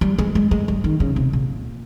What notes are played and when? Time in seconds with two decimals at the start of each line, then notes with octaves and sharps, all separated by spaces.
0.01 G3
0.19 G#3
0.35 G#3
0.51 G#3
0.68 G3
0.84 D#3
1.00 C#3
1.16 C3
1.33 A#2